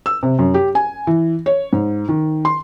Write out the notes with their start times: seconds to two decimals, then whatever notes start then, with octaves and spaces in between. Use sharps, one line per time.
0.06 E6
0.23 C3
0.39 F#2
0.54 G4
0.75 G#5
1.07 E3
1.46 C#5
1.73 G#2
2.09 D#3
2.45 C6